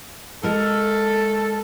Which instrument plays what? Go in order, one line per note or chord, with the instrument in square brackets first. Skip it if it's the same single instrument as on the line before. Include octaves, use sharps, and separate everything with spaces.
[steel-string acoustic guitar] G#3 A#4 [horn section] A4